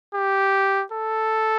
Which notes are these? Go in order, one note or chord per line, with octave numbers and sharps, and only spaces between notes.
G4
A4